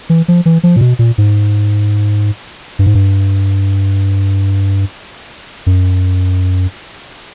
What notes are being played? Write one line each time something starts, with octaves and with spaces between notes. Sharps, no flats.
E3
F3
E3
F3
A#2
B2
A#2
G#2
G2
G#2
G2
F#2